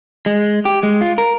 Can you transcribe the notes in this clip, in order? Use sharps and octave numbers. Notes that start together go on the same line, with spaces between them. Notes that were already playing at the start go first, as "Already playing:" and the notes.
G#3
G4
G#3
F4
A#4